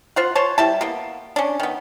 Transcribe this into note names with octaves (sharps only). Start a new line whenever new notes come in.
F4 C5 F#5
C5 C#5 A5
G3 E4 A5
A#3 B3
C#4 D4
D#3 B3